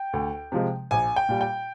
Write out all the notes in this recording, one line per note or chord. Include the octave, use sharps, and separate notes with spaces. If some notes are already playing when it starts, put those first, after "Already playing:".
Already playing: G5
D2
C3 F3 G#3
A#1 G#5
G5
A#2 G3
G5